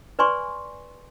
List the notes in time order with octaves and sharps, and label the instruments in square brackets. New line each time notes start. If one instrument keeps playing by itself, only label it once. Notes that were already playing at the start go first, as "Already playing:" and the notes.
[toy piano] B4 D5 G#5 C6 C#6